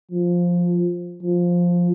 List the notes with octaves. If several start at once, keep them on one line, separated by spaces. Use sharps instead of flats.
F3
F3